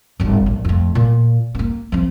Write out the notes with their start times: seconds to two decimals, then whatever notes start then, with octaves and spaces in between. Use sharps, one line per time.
0.20 D1 G1
0.46 A#1
0.65 F2 A3
0.95 A#2
1.55 A#3 B3
1.92 F3 C4